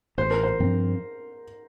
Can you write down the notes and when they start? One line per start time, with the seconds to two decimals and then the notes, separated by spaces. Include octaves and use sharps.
0.18 A1 C5
0.31 A#4
0.43 C5
0.60 G2 F3 C4